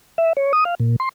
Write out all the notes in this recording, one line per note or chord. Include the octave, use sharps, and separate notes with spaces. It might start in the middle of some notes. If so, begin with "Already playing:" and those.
E5
C#5
D#6
F5
A#2
C6